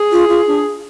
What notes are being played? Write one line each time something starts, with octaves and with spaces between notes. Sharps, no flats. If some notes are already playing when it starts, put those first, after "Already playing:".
Already playing: G#4
F4
F4
D4